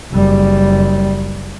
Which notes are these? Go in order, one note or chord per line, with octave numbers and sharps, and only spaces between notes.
F#1 G3